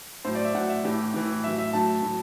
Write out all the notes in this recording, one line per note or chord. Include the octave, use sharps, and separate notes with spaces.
A2 F#3 C5
D5
E5
A2 F#3 F#5
E5
A2 E3 G4
A2 E3
A2 F#3 E5
E5
A2 F#3 A5
A2 F#3